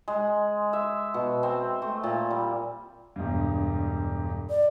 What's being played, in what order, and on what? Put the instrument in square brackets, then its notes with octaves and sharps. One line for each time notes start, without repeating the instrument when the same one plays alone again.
[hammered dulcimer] G#3
E5
B2
C4
A3
A#2
G3
[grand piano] E1 G2
[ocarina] D5